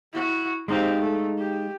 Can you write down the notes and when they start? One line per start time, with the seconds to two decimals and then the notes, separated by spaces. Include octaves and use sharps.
0.13 E4 F#4
0.68 G#3 C4 D#4 G4 F5
1.00 A3
1.38 G4